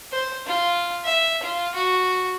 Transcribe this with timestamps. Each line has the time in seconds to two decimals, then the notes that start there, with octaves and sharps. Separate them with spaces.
0.12 C5
0.46 F4
1.05 E5
1.43 F4
1.74 F#4